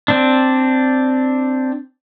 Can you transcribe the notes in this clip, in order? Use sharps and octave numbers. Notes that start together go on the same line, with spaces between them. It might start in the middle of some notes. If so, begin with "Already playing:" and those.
C4 D4